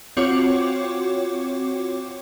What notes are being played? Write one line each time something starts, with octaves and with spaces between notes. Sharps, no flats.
C4 F4 F#4 C#5 D6